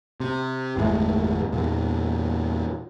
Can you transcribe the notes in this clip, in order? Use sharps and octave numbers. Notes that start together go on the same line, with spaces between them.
C3
G1 E2 A2 G#3
E2 A#2